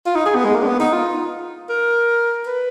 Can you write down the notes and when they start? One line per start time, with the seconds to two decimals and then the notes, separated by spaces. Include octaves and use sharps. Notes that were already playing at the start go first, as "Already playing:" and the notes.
0.06 F4
0.15 D#4
0.26 G#4
0.35 B3
0.45 G#3
0.54 A#3
0.62 D4
0.67 B3
0.80 D#4
0.93 F4
1.69 A#4
2.46 B4